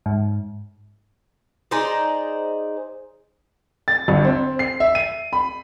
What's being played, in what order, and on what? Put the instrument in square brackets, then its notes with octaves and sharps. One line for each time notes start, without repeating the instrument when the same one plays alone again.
[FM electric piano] G#2
[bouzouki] D#4 G#4 C5 D5
[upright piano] A6
G1
C4
C7
E5
D#7
B5